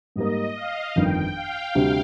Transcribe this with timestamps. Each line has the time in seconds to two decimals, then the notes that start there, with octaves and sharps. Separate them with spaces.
0.16 G#2 G3 A#3 D#5
0.56 F5
0.96 G1 F2 D#3 G5
1.36 F5
1.75 D2 C3 G3 D4